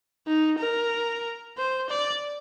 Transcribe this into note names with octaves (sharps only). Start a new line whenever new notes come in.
D#4
A#4
C5
D5